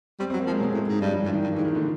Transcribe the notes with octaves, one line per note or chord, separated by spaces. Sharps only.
G3 C4
C4
F#3
A#3
F3
G#3
B2 F#3
A2
G#2
G2 G3
F3
G2 E3
D#3
G2
E3
G#2
D#3
A#2 D3